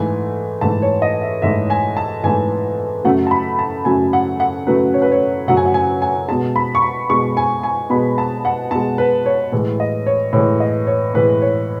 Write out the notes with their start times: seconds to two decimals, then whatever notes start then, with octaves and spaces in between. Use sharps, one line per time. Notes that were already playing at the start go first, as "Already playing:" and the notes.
Already playing: G#2 E3 A3 G#5
0.61 G#2 E3 A3 A5
0.82 C#5
1.02 D#5
1.22 E5
1.42 G#2 E3 A3 E5
1.70 G#5
1.97 A5
2.23 G#2 E3 A3 G#5
3.04 F#2 C#3 F#3 A3 F#5
3.27 A5
3.31 B5
3.59 A5
3.85 F#2 C#3 F#3 A3 G#5
4.13 F#5
4.40 F#5
4.67 F#2 C#3 F#3 A3 B4
4.94 C#5
5.02 B4
5.12 C#5
5.48 F#2 C#3 F#3 A3 F#5
5.57 G#5
5.66 F#5
5.74 G#5
6.02 G#5
6.28 B2 G#3 A5
6.56 B5
6.75 C#6
6.82 B5
7.10 B2 G#3 C#6
7.37 G#5
7.63 G#5
7.90 B2 B5
7.94 G#3
8.18 A5
8.45 F#5
8.71 B2 G#3 A5
8.98 B4
9.26 C#5
9.52 A2 E3 G#3
9.80 D#5
10.06 C#5
10.33 A2 E3 G#3 C#5
10.60 D#5
10.87 C#5
11.14 A2 E3 G#3 B4
11.42 C#5